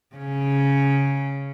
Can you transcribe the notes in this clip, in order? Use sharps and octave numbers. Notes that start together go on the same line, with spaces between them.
C#3 C#4